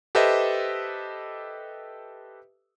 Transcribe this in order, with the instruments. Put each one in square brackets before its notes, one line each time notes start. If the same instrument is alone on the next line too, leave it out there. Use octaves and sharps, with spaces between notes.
[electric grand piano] G4 A4 B4 C5 D#5 E5